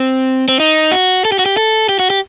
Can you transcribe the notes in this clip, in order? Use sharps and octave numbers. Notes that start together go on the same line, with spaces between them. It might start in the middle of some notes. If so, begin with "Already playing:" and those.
Already playing: C4
C4
D#4
F#4
A4
G4
F#4
G4
A4
G4
F#4
G4